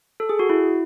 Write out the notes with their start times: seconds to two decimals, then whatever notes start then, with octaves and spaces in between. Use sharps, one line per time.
0.20 A4
0.29 G#4
0.39 F#4
0.49 E4